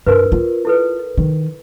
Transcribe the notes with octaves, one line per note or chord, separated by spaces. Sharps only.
G2 A#4 B4
F4
E4 A4 B4
D#3